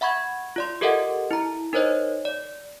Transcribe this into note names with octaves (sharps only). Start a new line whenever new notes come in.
E5 F#5 B5 C#6 G#6
F4 D5 C6
G4 A4 A#4 D#5 E5 F#5
E4 A#5
D#4 A#4 C5 C#5 D#5
D5